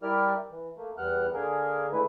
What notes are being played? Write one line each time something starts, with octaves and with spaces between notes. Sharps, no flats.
G3 E4 G4 A#4 D5 F6
E3
A3 A#3
E2 G3 B3 F#5 F6 F#6
D3 A#3 G#4 A#4
D3 G#3 A3 E4 B4